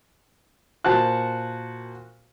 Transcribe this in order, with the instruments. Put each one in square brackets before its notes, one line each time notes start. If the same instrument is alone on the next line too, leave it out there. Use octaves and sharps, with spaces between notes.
[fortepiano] A#2 F#4 C5 F#5 A5 F#6